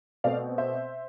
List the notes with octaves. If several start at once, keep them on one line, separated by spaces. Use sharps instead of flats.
B2 A3 C4 D5 F5
C5 E5